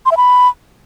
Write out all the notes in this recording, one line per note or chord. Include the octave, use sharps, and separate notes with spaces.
C6
E5
B5